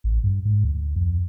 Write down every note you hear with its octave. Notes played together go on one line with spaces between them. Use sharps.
A1
G2
G#2
D2
F2